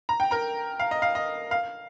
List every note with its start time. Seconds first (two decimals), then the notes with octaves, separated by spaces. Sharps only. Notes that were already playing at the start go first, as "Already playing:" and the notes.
0.09 A#5
0.20 G5
0.31 A#4 A#5
0.80 F5
0.91 D#5
1.02 F5
1.15 D#5
1.51 F5